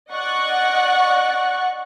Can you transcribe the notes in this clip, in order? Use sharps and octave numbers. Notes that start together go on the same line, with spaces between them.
D5 D#5 F#5 C#6 F#6